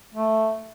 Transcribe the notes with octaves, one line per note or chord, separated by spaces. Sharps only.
A3